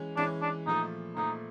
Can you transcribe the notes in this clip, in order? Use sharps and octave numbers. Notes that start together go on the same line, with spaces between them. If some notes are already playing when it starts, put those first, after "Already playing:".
Already playing: E3 G#3 C#4
E3 G#3 C#4 D4
D4
A#2 F3 A3 D#4
A#2 F3 A3 D#4